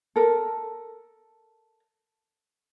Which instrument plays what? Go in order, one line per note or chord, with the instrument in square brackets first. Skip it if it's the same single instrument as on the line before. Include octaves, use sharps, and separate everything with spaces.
[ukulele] A4 A#4